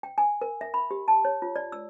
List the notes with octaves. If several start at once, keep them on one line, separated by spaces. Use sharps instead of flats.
G5
G#5
A#4
E5
B5
G4
A5
C#5
F4
D5
E6